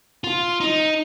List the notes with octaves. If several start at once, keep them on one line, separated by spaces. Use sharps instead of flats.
F4
D#4